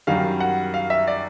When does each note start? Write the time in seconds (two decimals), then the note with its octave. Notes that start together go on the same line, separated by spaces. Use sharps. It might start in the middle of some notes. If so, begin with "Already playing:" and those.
0.07 F#2 D#3 G3 F5
0.40 F#5
0.74 F5
0.90 E5
1.07 D5